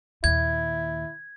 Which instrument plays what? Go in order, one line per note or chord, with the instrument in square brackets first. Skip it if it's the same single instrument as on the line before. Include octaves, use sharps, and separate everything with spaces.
[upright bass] D#2 A#2 [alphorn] E4 [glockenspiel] G#6